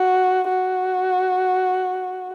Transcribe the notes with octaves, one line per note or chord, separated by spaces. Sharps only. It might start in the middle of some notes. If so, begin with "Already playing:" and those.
Already playing: F#4
F#4